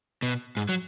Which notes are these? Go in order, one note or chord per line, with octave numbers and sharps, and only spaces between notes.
B2
G#2
F#3